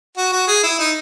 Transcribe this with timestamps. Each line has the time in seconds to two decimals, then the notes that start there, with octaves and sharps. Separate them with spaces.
0.18 F#4
0.33 F#4
0.48 G#4
0.64 E4
0.79 D#4